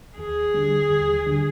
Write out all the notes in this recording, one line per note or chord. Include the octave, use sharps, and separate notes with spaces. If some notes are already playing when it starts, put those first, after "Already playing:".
D#2 G#4
D3 G3
D#2
D3 G3